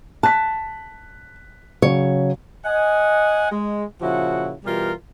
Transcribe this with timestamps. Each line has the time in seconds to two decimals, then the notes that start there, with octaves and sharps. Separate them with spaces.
0.23 A5 F#6 B6
1.82 C#3 F#3 C#5
2.65 D#5 F#5 G#5
3.52 G#3
4.02 A#2 C#3 F3 E4 F#4 F#5
4.64 B2 E3 G3 F4 G4 A#4